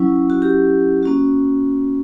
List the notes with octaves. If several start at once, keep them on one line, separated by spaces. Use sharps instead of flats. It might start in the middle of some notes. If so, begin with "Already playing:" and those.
Already playing: F#3 C#4 E4
F#4
G4
A#3 C#4 F#4